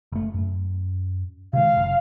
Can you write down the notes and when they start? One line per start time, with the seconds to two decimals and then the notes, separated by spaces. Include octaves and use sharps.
0.12 F#1 A3
0.34 F#2
1.53 C3 D#3 G#3 F5
1.77 F#1